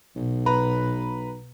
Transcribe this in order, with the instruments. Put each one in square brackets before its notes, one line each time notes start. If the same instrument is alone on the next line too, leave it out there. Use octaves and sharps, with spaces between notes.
[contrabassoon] B1 [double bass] B2
[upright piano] B4 A#5 B5